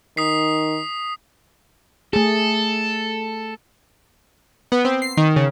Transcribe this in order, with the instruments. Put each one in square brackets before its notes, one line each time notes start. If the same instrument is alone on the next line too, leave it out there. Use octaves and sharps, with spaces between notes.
[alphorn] D#3 [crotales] D#6 B6 C7
[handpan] A3 G#4 [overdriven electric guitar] A4
[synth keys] B3
C4
C7
D#3
C#3